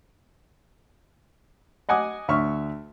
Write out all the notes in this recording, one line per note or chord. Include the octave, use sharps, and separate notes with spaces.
D#5 F#5 G#5 D6 D#6
D2 E5 C#6 F6